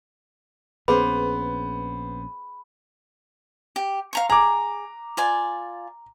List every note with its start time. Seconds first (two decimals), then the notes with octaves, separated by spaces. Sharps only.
0.88 A#1 B3 C#4 G#4 B4 C5 B5
3.76 G4
4.13 F5 A#5 C#6
4.30 G#4 A#5 D6
5.17 F4 D5 G#5